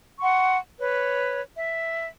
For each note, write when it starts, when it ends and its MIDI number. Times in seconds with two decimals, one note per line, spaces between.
0.19 0.56 78
0.19 0.56 84
0.19 0.56 85
0.79 1.41 71
0.79 1.41 73
1.55 2.07 76